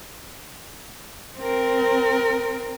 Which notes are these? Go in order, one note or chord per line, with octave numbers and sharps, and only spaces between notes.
C4 A#4